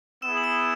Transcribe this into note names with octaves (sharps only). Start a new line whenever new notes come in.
B3 E4 G#4 E6 E7
F#7
E6 E7